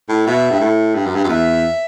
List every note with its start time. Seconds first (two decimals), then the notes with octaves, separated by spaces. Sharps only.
0.09 A2
0.26 B2 E5
0.50 G2
0.60 A2
0.95 G2
1.06 F#2
1.15 G2
1.24 F#2
1.29 E2 E5